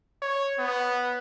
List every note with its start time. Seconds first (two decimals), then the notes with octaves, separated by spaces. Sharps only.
0.22 C#5
0.58 B3